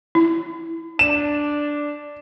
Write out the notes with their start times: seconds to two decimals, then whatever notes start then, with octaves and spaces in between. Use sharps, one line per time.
0.15 E4
0.99 D4 E7